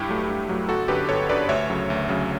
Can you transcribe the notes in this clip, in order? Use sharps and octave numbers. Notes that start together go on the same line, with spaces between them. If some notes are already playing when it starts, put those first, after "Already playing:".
Already playing: G2 E4 G4
F#3 A3
G2
F#3 A3
G1 F#4 A4
F#2 D3 G4 B4
G1 A4 C#5
F#2 D3 B4 D5
D2 C#5 E5
C#3 F#3
D2
C#3 F#3